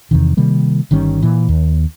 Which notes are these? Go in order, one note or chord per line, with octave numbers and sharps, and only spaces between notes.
E2 C3 D#3
C3 D#3 G3 A#3
G1 D#3 G3 C#4
A#2 E3
D#2